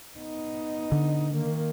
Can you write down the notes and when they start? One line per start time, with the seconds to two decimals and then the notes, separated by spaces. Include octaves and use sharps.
0.17 B3 D#4
0.92 D3
1.32 D#3 A#3